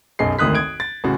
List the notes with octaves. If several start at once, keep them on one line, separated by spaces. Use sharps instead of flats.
B1 F#2 G#4 D#5 C7
G#1 D2 D#3 D#6 F#6 B6
D#6 G#6 D7
A6
A1 C#3 F#4